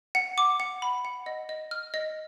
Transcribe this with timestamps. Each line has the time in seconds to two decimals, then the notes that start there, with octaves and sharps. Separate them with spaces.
0.15 F#5
0.38 D6
0.60 F#5
0.82 B5
1.05 F#5
1.26 D#5
1.49 D#5
1.71 F6
1.94 D#5